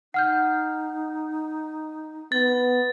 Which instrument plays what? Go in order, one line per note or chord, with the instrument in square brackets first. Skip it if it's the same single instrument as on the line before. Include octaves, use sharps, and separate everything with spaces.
[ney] D#4 [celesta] F#5 F6 G6
[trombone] B3 [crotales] A6